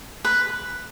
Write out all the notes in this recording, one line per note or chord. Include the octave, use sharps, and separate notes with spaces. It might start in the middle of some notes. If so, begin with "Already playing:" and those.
B4